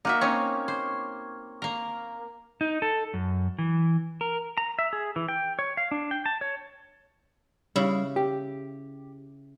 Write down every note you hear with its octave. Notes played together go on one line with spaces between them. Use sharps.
A#3 D#4 F#4 E5
C4 C#4 D#4 C#5
C5
A#3 A#4
D#4
A4
F#2
E3
A#4
A#5
E5
G#4
E3
G5
C#5
F5
D4
G5
A5
C#5
C#3 G3 E4
G4